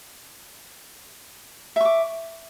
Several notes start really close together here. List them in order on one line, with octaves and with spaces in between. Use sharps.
E5 C#6 D6